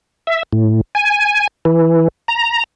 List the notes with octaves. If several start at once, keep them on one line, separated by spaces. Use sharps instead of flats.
E5
A2
G#5
E3
A#5